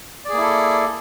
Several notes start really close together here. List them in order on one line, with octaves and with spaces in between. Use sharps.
D5 G#4 A#3 E4 A4